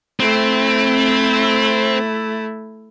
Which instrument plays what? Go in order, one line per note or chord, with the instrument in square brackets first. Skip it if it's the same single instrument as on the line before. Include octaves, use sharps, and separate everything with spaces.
[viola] A3 E4 [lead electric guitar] C4